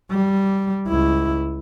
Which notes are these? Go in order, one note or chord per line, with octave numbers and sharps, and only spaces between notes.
G3
C#2 E4